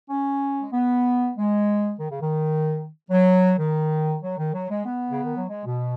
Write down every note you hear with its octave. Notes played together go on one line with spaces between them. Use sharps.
C#4
G#3
B3
G#3
D#3
C#3
D#3
F#3
D#3
F#3
D#3
F#3
G#3
B3
C#3
D#3
F#3
G#3
B2